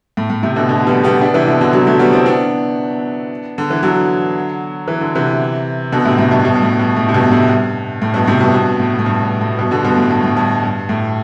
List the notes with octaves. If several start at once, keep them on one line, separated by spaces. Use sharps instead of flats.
A2
A2
A2 C3
B2 D3
B2 D3
G3 B3
G3 B3
B3 D4
C3 E3
B2 D3
B2 D3
D3 F#3
F#3 A3
G3 B3
C4 E4
B3 D4
D3
E3
D3 F#3
E3
D3
C3 E3
B2 D3
A2 C3
A2 C3
G2 B2
G2 B2
G2
A2
G2
A2
C3
G2 B2
A2 C3
G2
A2
G2 B2
A2 C3
G2 B2
G2 B2
A2
A2
G2
G2
A2
G2 B2
B2 D3
G2 B2
A2
G2
A2
G2
G2
A2